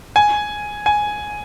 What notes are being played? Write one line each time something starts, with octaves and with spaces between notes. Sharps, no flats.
G#5
G#5